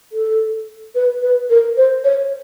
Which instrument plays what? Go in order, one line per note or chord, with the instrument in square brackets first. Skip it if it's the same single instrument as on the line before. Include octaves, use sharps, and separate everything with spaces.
[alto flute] A4
B4
B4
A#4
C5
C#5